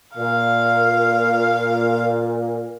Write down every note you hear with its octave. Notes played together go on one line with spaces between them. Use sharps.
A#2 A#4 F5